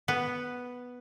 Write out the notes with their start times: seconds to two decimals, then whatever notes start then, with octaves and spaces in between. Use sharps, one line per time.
0.08 B3